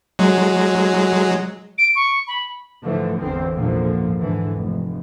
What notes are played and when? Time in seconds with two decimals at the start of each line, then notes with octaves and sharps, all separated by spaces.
0.19 F#3 G#3
1.78 D7
1.95 C#6
2.27 B5
2.83 G#2 D3 E3 F3 A3
3.21 G#1 E2 D3 E3 B3 C4
3.55 A#1 E2 G#2 D3 F3 A#3
4.18 G#2 D3 E3
4.55 F1